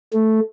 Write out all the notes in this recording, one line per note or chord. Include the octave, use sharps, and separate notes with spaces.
A3